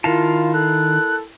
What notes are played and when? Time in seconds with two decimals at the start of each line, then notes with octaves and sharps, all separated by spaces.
0.04 D#3 E4 F4 A#4 F5 A5
0.54 A4 F#6